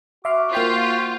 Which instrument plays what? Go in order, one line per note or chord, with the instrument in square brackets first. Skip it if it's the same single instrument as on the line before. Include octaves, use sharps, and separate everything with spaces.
[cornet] F#4 [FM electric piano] E5 C6 F6 [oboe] D6
[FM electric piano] A#3 G5 B6 [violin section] F4 [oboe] C5